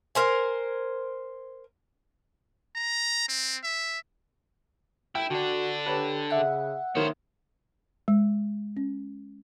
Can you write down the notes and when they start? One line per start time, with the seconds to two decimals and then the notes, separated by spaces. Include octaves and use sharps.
0.15 A#4 C5 G#5
2.75 A#5
3.29 C4
3.63 E5
5.15 E4 G5
5.30 D3 D4 F#4
5.86 G4 B4 C#5
6.30 C#3 E5 F#5
6.95 D#3 A#3 B3 C5 C#5
8.08 G#3
8.77 C#4